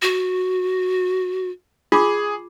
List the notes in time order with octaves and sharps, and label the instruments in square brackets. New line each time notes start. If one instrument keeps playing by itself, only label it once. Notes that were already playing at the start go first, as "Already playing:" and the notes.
[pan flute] F#4
[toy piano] F4 D6 [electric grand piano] G#4